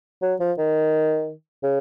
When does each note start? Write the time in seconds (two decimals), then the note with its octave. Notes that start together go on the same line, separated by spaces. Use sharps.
0.22 F#3
0.40 F3
0.58 D#3
1.63 C#3